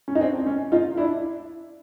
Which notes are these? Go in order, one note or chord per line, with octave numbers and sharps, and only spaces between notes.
C#4
D#4
C4 D4
C#4
D#4 F4
D4 E4